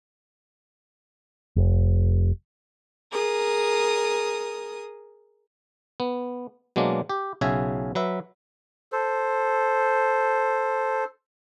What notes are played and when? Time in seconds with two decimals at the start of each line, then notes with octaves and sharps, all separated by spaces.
1.56 F1
3.12 G#4 A#4 D#6
6.00 B3
6.76 B2 F#3 G#3 A#3 D4
7.09 G4
7.41 B1 C#3 F#4 G#4 E5 G#5
7.95 F#3 B4 E5
8.92 A4 C5